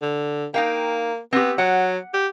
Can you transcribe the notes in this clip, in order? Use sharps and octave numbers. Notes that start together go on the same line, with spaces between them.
D3
A#3 D#4 F5 G5
B3 C4 G4
F#3 F#5
G4